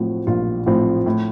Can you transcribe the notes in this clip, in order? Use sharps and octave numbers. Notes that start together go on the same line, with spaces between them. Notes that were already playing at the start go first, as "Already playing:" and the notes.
Already playing: A2 F3 C4 F#4
A#1 F4
A2 F3 C4
A2